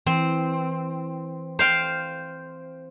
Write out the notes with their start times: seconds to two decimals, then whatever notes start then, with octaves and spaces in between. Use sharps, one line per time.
0.06 E3 C4
1.59 C5 F5 G5